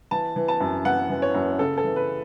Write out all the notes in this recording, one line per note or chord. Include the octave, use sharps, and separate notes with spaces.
E3 A5
E3
A5
F#2
E3 F#5
E3
C#5
F#2
C#3 A4
A4
E3
B4